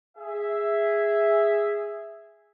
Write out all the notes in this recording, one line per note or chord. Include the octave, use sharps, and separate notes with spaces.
G#4 E5